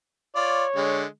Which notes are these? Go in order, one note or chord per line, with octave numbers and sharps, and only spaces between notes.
F4 C#5 D5
D3 G#3